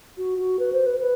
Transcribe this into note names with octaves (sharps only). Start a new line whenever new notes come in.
F#4
F#4
B4
C5
B4
B4